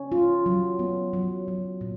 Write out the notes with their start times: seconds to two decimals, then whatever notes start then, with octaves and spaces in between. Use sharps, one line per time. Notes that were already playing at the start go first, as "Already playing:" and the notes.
Already playing: C#4
0.12 F4
0.46 F#3
0.79 B3
1.13 F#3
1.48 F#3
1.81 A#2